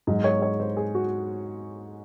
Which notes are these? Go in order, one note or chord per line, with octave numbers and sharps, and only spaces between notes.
G#2 F#3 D#5
C#5
C#5
C5
G#4
F#4